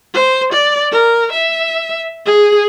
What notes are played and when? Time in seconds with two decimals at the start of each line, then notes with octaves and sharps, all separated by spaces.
0.14 C5
0.52 D5
0.92 A#4
1.32 E5
2.26 G#4